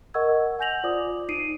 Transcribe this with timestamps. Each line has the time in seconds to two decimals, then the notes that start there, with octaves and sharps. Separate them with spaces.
0.14 A#4 D#5 F#5 C#6 E6 G#6
0.59 F#5 G#5 G6 A#6 F7 F#7
0.83 F4 C5 D5 D6 D#6
1.29 D#4 C7 D7 D#7